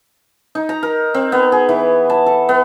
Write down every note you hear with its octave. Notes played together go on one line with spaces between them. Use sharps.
D#4
A#5
A#4
C4
B3
G#4
E3
A5
A4
B3